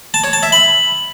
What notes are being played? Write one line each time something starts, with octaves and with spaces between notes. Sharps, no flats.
A5
C#5
A5
E5
B5